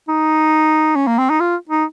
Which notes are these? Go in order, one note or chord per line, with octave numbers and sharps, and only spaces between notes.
D#4
C#4
A#3
C4
D#4
F4
D#4